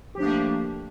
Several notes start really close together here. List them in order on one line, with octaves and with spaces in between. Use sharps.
G4 F3 D4 A3 A#3